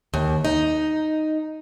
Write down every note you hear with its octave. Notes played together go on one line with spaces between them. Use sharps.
D#2
D#4